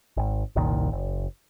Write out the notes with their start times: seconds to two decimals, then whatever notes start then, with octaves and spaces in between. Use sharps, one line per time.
0.17 G#1
0.56 F#1 C2 A#2 D#3
0.92 F#1